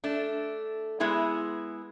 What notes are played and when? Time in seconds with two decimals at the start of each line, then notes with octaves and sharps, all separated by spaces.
0.04 A3 D4
1.00 G#3 B3 E4 G#4 B4